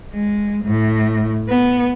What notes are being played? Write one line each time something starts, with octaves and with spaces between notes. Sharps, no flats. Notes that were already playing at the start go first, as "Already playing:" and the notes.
G#3
A2
B3